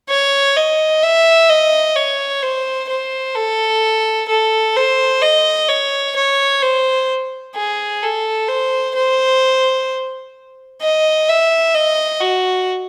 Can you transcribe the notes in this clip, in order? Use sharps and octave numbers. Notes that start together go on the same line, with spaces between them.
C#5
D#5
E5
D#5
C#5
C5
C5
A4
A4
C5
D#5
C#5
C#5
C5
G#4
A4
C5
C5
D#5
E5
D#5
F#4